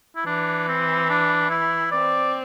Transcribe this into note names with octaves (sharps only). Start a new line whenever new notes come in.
E4
E3 D4
C4
D4
E4
C4 D5